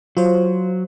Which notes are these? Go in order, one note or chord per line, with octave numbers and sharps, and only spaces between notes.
F#3 F4 C5